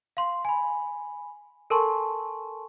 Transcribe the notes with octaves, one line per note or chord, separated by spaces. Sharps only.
F5 C6
G#5 B5
A4 A#4 G#5 A5 C6 C#6